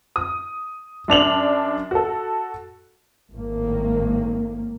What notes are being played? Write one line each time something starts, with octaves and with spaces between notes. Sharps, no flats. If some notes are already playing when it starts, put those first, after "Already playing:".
D#6
F#2 D4 F7 F#7
F#4 A4
G#1 A2 D#3 A#3